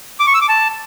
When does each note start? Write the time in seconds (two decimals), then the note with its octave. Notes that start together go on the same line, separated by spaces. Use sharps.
0.20 D6
0.27 C#6
0.34 E6
0.41 D6
0.49 A5